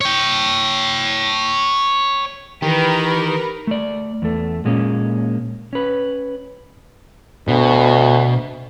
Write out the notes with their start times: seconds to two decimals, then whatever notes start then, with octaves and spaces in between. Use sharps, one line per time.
0.01 C#5 G5
2.62 D#3 E3 G4 A#4 B4
3.67 A3 D5
4.22 E2 A3
4.65 A#2 G#3 A#3 C#4
5.73 C#4 B4
7.48 D2 B2